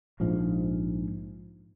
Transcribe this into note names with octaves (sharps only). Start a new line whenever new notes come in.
A#1 G#2 F3 G#3